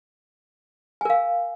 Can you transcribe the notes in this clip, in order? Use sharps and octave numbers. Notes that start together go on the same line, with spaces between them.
A#4 F5 G#5